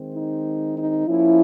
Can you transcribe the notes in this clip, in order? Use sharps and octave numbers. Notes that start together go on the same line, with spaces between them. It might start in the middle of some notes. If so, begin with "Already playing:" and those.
Already playing: D#3 G#3 C4
D#4
D#4
F3 A#3 C#4 E4